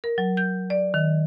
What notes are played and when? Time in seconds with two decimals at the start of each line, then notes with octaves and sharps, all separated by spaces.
0.04 A#4
0.18 F#3
0.37 G6
0.70 D5
0.94 D#3